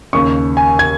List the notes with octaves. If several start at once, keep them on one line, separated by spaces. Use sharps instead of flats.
D#2 C#3 C#6
G#5
G#6